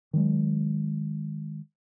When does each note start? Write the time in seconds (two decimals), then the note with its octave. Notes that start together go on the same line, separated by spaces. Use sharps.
0.13 D#3 F#3 G#3